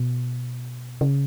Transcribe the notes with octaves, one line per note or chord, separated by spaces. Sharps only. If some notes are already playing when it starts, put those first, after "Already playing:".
Already playing: B2
C#3